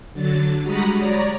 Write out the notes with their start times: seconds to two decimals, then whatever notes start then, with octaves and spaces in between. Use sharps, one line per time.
0.13 D3 F#3 A6
0.63 G3 G#3 F#4 A#5 B5 D#6
0.97 C#5 D5 A#5